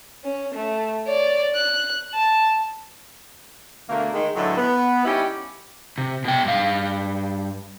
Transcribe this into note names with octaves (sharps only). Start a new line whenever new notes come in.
C#4
A3
C#5 D5
F#6
A5
B2 D3 A3 A#3
D#3 G#3
A2 D3 E3 F#3 G#3 A3
B3
G3 C#4 D#4 E4 G4
C3
B2 G5
G2 F5